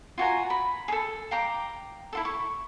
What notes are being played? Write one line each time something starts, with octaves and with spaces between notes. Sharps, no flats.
F4 F#4 G#5 A#5
B5
G#4 A4
F5 G5 A#5 D6
E4 F4 A4
C#6